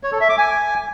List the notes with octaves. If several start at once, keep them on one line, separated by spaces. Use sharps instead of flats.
C#5
A4
E5
D6
G#5